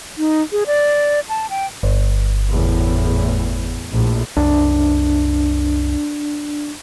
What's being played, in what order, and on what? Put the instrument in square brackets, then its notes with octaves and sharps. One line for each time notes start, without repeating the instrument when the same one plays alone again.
[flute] D#4
G#4
D5
A5
G5
[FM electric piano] G1
[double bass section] E2 A2
A#1 A2
[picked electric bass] C2 F#2 [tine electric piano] D4